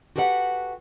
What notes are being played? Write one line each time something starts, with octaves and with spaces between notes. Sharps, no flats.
F#4 G4 A4 B4 E5 F#5